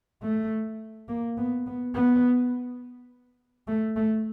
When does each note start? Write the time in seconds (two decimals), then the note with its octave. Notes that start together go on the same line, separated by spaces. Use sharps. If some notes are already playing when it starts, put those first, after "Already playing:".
0.22 A3
1.09 A#3
1.37 B3
1.67 B3
1.95 B3
3.68 A3
3.96 A3